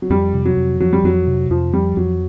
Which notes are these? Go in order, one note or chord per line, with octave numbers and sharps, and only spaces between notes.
F#3
F2 G3
C3
F#3
F2
F3 F#3
G3
F2 F#3
C3
F2 F3
F3 G3
F2 F#3